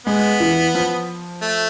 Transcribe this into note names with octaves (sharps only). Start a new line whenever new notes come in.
G#3 B3
E3
F3
A3